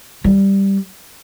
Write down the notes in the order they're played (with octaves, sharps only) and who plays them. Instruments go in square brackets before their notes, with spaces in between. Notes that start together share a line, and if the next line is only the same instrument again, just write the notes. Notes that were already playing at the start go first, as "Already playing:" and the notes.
[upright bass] G3